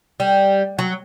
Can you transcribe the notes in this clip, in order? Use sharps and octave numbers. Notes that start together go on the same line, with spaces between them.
G3
F#3